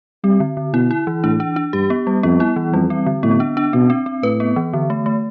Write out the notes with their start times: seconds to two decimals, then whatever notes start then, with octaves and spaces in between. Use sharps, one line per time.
0.24 G3 C4
0.40 D3
0.57 D3
0.73 B2 E4
0.91 E4
1.07 E3
1.23 A2 D4
1.40 D4
1.56 D4
1.73 G2 G4
1.90 B3
2.07 G3
2.23 F2 B3
2.40 E4
2.56 E3
2.73 F2 G3
2.90 C4
3.07 D3
3.23 A2 B3
3.40 D4
3.57 D4
3.73 B2 C4
3.90 C4
4.06 C4
4.23 A2 B4
4.40 B3
4.56 E3
4.73 D3
4.90 A3
5.06 A3